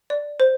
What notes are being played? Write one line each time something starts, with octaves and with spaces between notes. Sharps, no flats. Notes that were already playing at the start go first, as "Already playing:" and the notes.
D5
C5